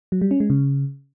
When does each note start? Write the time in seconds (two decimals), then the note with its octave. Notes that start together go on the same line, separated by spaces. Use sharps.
0.12 F#3
0.21 G3
0.31 C#4
0.40 G#3
0.50 C#3